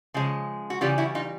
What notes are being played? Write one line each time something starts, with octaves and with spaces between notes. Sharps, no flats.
C#3 F3 G#3
F#4
C#3 E3 G3 F4 G4
E4 F#4
D#4 F4